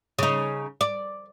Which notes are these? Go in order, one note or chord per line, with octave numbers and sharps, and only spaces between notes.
C#3 D#4
D5